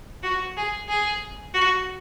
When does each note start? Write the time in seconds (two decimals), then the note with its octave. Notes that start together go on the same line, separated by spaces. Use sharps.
0.23 F#4
0.57 G#4
0.88 G#4
1.54 F#4